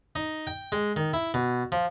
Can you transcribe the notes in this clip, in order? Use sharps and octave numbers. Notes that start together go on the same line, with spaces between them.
D#4
G5
G#3
D#3
E4
B2
F3